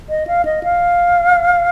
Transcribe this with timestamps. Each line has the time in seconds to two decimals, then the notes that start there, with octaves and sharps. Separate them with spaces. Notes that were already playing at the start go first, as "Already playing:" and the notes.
0.10 D#5
0.27 F5
0.45 D#5
0.63 F5